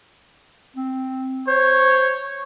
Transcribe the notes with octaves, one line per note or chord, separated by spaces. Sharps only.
C4
C5 C#5